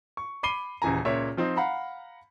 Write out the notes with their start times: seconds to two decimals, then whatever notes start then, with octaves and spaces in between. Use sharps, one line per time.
0.17 C#6
0.43 B5 D6 C7 D#7 G7
0.82 D#1 C#3 E3 G#5 A#5
1.05 C#2 A#2 C#5 E5
1.37 F3 C4 D#4
1.57 F5 F#5 A#5 B5